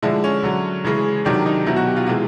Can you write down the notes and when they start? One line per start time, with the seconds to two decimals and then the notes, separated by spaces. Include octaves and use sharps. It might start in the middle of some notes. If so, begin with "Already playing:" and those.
0.02 D3 F3 G#3 E4
0.24 C#4
0.43 D3 F#3
0.84 C#3 E3 G#3
1.25 C3 D#3 F#3 D4
1.46 D#4
1.66 B2 F#3 E4
1.76 F#4
1.87 G4
1.96 F4
2.07 C3 E3 G#3 F4